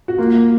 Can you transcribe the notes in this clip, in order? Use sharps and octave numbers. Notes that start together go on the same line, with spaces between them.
F#4
A#3 F4